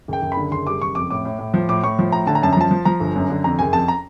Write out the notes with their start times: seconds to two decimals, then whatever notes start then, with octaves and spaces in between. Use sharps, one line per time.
0.08 F#1 G5
0.22 F#1
0.32 B5
0.37 D3
0.51 F#1 C6
0.67 G3 D6
0.81 F#1 C#6
0.95 F2 D6
1.10 A2 D6
1.25 A2
1.39 A2
1.54 F3
1.69 A2 D6
1.83 A2 C#6
1.99 F3
2.12 A2 A#5
2.27 D3 A5
2.35 A#5
2.43 F#2 A5
2.53 A#5
2.57 F3 A5
2.71 F3
2.85 F3 A#5
3.00 G1
3.16 F#2
3.30 D3
3.44 F2 A#5
3.59 F#1 G#5
3.73 F2 A5
3.88 A#5